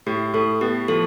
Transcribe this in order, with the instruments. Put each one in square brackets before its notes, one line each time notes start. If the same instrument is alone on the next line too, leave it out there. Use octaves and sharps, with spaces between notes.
[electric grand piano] A2 [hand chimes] G4
[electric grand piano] A2 [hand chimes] A4
[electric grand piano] B3 [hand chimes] G4
[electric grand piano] F3 [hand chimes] A4